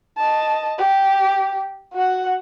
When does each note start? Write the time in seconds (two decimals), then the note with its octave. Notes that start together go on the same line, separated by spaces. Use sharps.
0.17 D#5 A5
0.78 G4
1.93 F#4 F#5